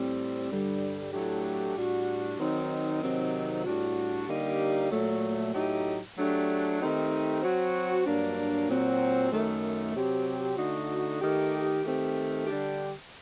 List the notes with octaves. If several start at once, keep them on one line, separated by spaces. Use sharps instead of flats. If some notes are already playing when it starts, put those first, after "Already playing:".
Already playing: A2 G3 C4
G2 D3 G3
A2 F#3 A3 D4 G4
A2 G3 D4 F#4
D#3 F#3 C4 D#4
C3 D#3 F#3 C4 D#4
A2 G3 D4 F#4
D3 G3 A#3 D#4 G4
A#2 F#3 A3
A2 F#3 A3 D#4 G4
F#3 A3 D4 G4
D#3 A3 C4 D#4 G4
F#3 C4 F#4
G2 F#3 A#3 D4
A#2 F#3 C4 F#4
F#2 D#3 A3
C3 F#3 C4 G4
D3 A3 D#4 F#4
D#3 A3 D#4 G4
D#3 A3 C4 G4
D3 G3 D4 G4